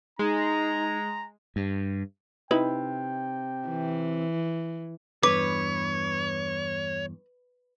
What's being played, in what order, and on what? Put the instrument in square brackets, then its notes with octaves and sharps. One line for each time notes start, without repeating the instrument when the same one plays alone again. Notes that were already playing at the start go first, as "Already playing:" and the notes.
[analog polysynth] G#3 [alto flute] D#4 [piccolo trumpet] A#5
[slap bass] G2
[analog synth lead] C3 [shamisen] D#4 E4 B4 [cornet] G5
[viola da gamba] E3
[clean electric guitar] E2 G2 [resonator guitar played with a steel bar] B4 [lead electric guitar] C#5 [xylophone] D6